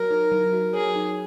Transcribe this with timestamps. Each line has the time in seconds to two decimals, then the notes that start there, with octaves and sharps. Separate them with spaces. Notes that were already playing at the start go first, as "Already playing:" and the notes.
Already playing: F#3 F#4 A#4 C#5
0.11 D#4
0.32 F#3
0.53 F#4
0.74 G#4 C#5
0.96 D#4